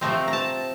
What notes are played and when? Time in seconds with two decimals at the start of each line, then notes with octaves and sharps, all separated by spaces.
0.01 C3 F3 A3 C4 A#5
0.28 A#5
0.33 A5